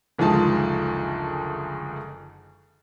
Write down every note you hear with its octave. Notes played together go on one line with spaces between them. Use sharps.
F#1 D2 D#3 F3 G#3 A5